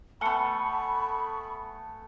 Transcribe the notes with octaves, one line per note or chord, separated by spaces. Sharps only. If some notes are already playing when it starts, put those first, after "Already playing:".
A3 B3 G#5 A5 B5 C#6 C#7